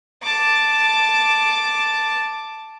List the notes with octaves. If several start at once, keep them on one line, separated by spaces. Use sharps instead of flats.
A5 D6